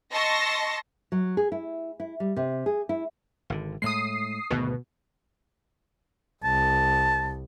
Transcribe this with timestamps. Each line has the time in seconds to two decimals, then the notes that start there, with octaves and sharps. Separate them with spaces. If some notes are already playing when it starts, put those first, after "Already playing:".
0.13 D#5 A5 C6 C#6 E6 A#6
1.12 F#3
1.37 G#4
1.52 E4
2.00 E4
2.20 G3
2.36 C3
2.66 G#4
2.89 E4
3.50 G#1 D3
3.82 A2 G#3 D#6 C7
4.51 G#1 D2 B2
6.44 C2 A5